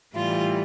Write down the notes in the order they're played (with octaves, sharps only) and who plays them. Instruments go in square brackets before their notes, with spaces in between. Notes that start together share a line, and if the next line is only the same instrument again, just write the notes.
[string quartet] A2 E3 G3 F4